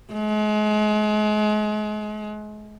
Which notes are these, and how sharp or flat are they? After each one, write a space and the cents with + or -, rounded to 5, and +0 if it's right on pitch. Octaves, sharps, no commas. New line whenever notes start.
G#3 +35